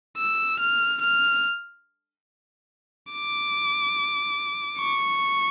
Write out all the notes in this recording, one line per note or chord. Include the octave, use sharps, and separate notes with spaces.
E6
F6
F6
D6
C#6